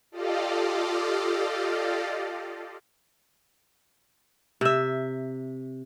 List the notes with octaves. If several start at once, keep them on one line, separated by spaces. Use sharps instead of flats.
F4 G4 A4 D5 D#5 F5
C3 E5